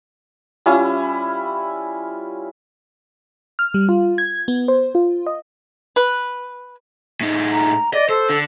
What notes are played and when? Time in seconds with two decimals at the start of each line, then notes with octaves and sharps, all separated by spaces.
0.66 G3 C#4 E4 F4
3.59 F6
3.74 G3
3.89 F4
4.18 G#6
4.48 B3
4.68 C5
4.95 F4
5.26 D#5
5.96 B4
7.21 A2 D#4
7.52 A#5
7.93 D5 D#5
8.09 A4 C5
8.30 D3